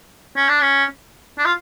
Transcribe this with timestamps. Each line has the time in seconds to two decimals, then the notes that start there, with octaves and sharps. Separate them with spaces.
0.36 C#4
0.49 D4
0.61 C#4
1.38 D4
1.45 F4